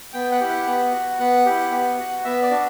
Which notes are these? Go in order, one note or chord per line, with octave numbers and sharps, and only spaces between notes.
B3 G5
F#5
E4 G4
F#5
B3
F#4
B3 F#5
E4 G4
B3
F#4
B3 E5
D5
D4 F#4